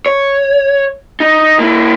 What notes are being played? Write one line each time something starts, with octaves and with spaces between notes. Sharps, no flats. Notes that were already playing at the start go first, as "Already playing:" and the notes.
C#5
D#4
A#3 E4